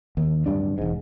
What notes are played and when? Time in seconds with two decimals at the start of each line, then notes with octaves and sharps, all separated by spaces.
0.17 D#2
0.46 D1 G1 G2 D4
0.78 E1 G#2